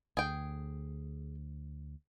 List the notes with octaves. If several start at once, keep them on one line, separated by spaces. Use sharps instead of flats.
D2 G#4 G5